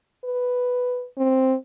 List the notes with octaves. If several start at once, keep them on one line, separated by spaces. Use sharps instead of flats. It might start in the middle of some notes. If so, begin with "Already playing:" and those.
B4
C4